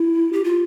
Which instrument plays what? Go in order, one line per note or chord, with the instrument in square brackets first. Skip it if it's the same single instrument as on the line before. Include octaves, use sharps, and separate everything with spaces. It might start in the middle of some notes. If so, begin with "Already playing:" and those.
Already playing: [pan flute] E4
G4
F4